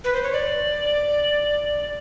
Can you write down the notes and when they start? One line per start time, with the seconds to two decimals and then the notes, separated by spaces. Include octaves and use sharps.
0.04 B4
0.13 C5
0.23 C#5
0.33 D5